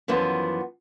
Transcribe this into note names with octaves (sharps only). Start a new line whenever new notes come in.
F#2 E3 F3 B3